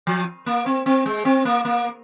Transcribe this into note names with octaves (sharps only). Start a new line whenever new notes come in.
F3
A#3
C4
C4
G#3
C4
A#3
A#3